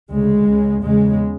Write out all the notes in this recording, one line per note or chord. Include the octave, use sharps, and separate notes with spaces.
D2 C#3 G#3
C#2 C#3
E2 C#3 G#3